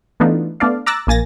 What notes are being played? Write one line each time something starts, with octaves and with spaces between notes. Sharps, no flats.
E3 A3 B3 D4 D#4 F4
A3 B3 D4 D5 F5
A#5 D6 E6 F#6 A6 A#6
A#1 A#3 G#5 A6 A#6